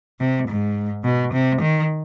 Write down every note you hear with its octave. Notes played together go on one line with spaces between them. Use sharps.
C3
G#2
B2
C3
D#3